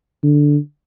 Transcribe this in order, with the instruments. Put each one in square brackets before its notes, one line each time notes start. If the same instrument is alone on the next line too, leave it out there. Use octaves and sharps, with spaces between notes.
[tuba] D3